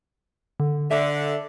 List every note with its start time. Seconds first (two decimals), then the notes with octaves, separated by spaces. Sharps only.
0.60 D3
0.91 D3 E5